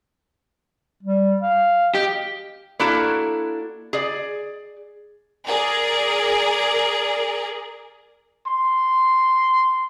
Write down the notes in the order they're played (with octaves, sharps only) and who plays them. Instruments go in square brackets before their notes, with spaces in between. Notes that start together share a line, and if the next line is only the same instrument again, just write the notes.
[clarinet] G3
F5
[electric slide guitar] G4 [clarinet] D#5
[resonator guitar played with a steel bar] A#3 D4 E4 F#4 A4
G#4 D5
[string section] G#4 A#4 D5
[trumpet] C6